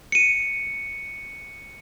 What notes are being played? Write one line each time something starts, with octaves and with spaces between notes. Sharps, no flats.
C#7 D#7